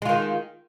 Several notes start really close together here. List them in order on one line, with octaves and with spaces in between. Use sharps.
G#3 F4 D#3